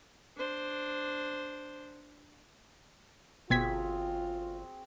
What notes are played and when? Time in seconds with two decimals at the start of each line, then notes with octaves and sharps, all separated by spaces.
0.37 D4 C5
3.50 G1 B2 C4 F4 F#4 G#4 G#6 B6